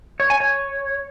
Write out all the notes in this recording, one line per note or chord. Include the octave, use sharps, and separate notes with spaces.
C#5
G#5
C#5